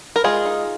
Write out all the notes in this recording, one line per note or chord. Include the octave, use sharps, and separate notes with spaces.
A#4
G#3 F4 G#4
D#4